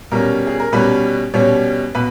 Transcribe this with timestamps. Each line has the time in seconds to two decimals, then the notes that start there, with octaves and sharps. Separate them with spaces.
0.11 B2 G3 C#4 A#4
0.47 G#4
0.60 A#4
0.72 B2 G3 C#4 B4
1.34 B2 G3 C#4 C#5
1.95 B2 B4